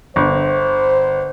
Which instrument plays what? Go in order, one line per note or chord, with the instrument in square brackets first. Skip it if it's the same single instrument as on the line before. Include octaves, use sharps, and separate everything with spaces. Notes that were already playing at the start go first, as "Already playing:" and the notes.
[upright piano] G1 [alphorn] C5